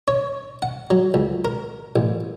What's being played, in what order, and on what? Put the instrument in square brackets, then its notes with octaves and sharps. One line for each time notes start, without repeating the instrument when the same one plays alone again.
[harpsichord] C#5
F#5
F#3
C#2
A#4
A1